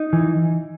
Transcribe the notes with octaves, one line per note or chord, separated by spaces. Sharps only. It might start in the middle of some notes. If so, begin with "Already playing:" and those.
Already playing: D#4
E3